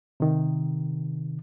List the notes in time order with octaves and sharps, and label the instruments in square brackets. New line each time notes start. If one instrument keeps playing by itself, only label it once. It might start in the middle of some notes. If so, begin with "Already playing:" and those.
[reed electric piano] C3 D#3